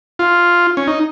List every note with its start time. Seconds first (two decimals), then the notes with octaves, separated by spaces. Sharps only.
0.19 F4
0.77 C#4
0.87 D#4